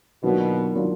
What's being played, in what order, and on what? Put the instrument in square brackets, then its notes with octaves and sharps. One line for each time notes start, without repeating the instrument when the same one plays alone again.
[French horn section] B2 [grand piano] D#3 F#3 A#3 D4 F4
[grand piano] D#3 F#3 A#3 D4 F4